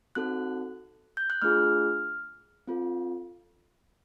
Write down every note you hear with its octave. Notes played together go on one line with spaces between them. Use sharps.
C4 D#4 F#4 A4 F#6
G6
F#6
A3 D4 F4 G#4 F6
C4 F4 A4